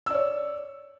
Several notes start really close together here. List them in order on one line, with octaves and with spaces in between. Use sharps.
E6 D5 C#5